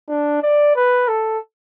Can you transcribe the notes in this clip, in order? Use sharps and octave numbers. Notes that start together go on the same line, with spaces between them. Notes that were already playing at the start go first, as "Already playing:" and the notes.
D4
D5
B4
A4